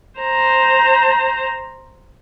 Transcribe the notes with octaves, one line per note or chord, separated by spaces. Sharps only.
C5 A#5